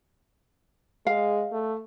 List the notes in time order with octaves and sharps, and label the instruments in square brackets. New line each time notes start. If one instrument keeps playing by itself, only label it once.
[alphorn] G#3 [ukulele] F5
[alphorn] A3